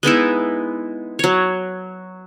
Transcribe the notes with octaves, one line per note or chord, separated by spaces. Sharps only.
G#3 B3 D#4 E4
F#3 C#5